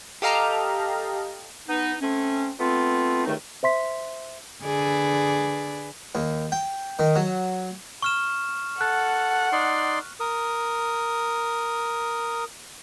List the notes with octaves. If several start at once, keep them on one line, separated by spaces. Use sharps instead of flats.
G4 A4 D#5 F5 A5 A#5
B3 D#4
A3 C4 C#4
A3 B3 C4 F4
C#2 G2 D#3 A3 D#4
C5 E5 C6 B6
D3 G#4 B4 D5
D#2
G5
D#3
F#3
C#6 F6 E7
A4 F#5 F#6
D#4 D5 C6
A#4 D#6